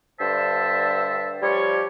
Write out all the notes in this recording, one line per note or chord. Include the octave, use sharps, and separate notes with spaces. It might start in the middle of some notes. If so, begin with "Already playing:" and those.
G2 D3 C5 E5 A5
F3 G3 G4 C#5